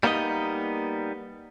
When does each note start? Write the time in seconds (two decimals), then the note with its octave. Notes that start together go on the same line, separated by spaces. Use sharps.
0.03 G3 A#3 B3 D#4 D#5